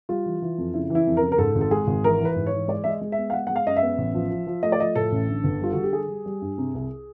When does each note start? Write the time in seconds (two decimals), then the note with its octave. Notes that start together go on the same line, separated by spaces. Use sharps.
0.09 G3 F4
0.26 E3
0.42 E3
0.58 F2
0.74 C#3 E4
0.90 E3 E4
1.07 F2
1.17 A#4
1.23 C#3
1.32 A#4
1.38 G#2 A4
1.55 G#1
1.61 A4
1.71 G#3 G#4
1.87 G#1
2.04 E3 A#4
2.20 E3
2.25 B4
2.36 G#2
2.47 C#5
2.52 E3
2.68 G#3 D5
2.84 G#3 E5
2.90 D#5
3.02 G#3
3.12 E5
3.18 B3
3.30 F5
3.33 G#3 F#5
3.47 F#5
3.50 G#3
3.56 F5
3.66 F#2 D#5
3.76 E5
3.83 B3
3.98 A1
4.15 F3
4.30 F3
4.47 F3
4.63 A3 D#5
4.72 D5
4.80 F3 D#5
4.95 A2 A4
5.12 A1
5.28 D3
5.44 G1
5.61 G3 F4
5.72 D3 F#4
5.83 G4
5.93 G3 G#4
6.08 G3
6.26 G3
6.42 G2
6.58 C3
6.74 C2